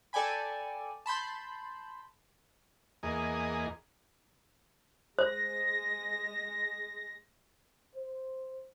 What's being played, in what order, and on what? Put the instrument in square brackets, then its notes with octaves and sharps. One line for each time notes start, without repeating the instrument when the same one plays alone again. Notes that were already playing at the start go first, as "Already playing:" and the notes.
[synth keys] A4 D5 G5 G#5 B5
A5 B5 C6 G6
[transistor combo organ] E2 A#3 G#4 D#5
[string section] G#3 A#6 [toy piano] C5
[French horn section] C5